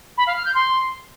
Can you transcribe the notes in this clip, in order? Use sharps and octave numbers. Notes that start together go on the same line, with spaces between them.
B5
F5
F6
G6
C6